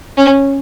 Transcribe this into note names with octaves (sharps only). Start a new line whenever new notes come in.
C#4